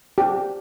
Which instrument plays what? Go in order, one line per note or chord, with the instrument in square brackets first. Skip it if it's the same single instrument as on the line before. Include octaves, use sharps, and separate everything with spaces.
[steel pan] G4